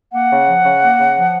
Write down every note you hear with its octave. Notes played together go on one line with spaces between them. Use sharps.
A#3 F#5
C#3
F3
C#3
A#3
C#3
F3